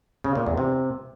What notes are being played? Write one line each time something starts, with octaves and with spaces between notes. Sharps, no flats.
C#3
A#2
E2
C3